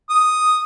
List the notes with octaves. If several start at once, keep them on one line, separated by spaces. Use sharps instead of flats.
D#6